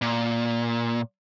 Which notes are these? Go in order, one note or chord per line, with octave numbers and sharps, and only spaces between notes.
A#2